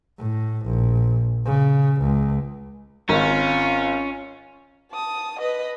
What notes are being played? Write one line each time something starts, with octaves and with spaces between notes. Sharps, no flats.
A2
A#1
C#3
C#2
G#1 C#4 F4
A5 D#6
B4 D#5